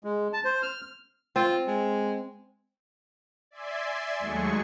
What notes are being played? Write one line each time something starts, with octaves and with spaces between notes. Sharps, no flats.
G#3
A5
C5
F6
C4 F4
G#3
D5 E5 G#5 C6
D#2 F#3 G#3 A3 G#4 C#6